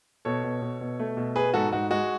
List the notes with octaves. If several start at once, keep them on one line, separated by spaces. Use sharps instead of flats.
B2 A4 C#5
B2
B2
B2
A3
B2
B3 G#4 B4
G#2 F#4 A4
G#2 F#4
G#3 F#4